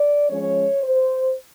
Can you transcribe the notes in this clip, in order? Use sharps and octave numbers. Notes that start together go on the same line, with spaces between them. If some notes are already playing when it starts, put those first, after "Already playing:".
Already playing: D5
F3 G#3 C#4 C#5
C5